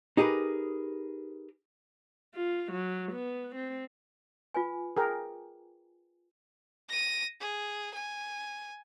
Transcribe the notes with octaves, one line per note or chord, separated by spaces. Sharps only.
D#4 G4 G#4 A#4 B4
F4
F#3
B3
C4
F4 B4 G#5
G#4 A#4 G5
A#6 D#7
G#4
G#5